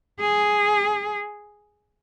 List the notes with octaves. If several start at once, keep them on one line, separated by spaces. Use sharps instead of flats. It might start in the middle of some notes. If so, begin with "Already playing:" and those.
G#4